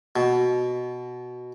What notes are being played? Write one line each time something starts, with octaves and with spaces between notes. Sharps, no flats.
B2